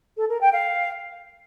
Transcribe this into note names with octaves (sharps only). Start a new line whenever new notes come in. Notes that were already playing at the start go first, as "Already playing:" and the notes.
A4
A#4
G5
F5